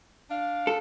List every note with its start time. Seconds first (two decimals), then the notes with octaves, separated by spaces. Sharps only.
0.29 D4 F5
0.67 A4